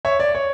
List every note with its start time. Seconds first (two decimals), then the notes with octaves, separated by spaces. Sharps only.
0.05 C#5 E5
0.20 D5
0.35 C#5